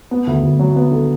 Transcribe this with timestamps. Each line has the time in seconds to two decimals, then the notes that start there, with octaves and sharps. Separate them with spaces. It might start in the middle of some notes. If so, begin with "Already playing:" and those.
0.11 B3
0.27 D2
0.43 D2
0.59 F#3
0.76 B3
0.91 D3